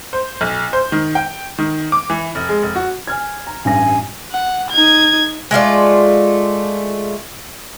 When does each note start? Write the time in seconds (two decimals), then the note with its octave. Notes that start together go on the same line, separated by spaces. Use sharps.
0.13 C5
0.41 B1
0.73 C5
0.92 D#3
1.15 G5
1.58 D#3
1.92 D6
2.10 E3
2.35 F1
2.49 G#3
2.63 F1
2.76 F#4
3.07 G#5 F6 G#6
3.47 A#5
3.65 A1 G2 G#5 A#6
4.32 F#5
4.70 D#4 G#6
5.51 G#3 A3 F4 D5